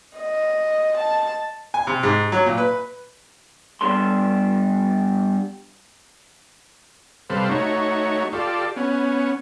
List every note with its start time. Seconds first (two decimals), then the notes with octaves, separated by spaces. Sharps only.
0.18 D#5
0.98 A5
1.74 G#5
1.87 C3
2.03 G#2
2.32 F#3
2.46 A#2
2.58 B4
3.81 G2 G3 B3 D4 A4 C6
7.30 C3 G3 A4 B4 C5 F5
7.49 A3 D#4 F#4 C#5
8.33 F4 G4 A4 D5
8.77 B3 C#4